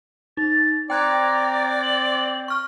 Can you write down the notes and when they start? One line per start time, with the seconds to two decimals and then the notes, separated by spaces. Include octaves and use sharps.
0.37 D#4 A6
0.90 C4 D5 G5 A#5 F#6 G#6
1.83 F#7
2.48 C#6 F6